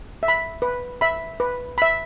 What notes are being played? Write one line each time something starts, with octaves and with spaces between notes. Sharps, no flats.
E5
B5
B4
E5 B5
B4
E5 B5